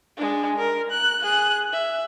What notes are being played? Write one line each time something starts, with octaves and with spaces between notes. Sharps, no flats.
G#3 D4
A#4
F#6
G#4 F#6
E5